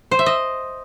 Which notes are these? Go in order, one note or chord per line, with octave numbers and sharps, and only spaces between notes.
C5
E5
D#5